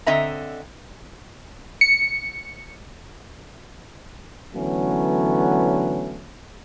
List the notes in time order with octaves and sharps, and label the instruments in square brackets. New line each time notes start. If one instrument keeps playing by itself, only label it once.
[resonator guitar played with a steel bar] D3 C4 D#5 E5 A#5
[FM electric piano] C#7
[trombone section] D3 E3 F#3 A3 B3 C#4